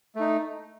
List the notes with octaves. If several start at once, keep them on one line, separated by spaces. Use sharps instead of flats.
A3 D#4